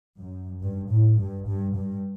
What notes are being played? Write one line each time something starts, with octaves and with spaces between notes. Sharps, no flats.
F#2
G2
A2
G2
G2
G2